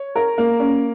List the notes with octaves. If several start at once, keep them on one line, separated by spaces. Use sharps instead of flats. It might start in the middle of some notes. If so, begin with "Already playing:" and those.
Already playing: C#5
A#4
A#3
C#4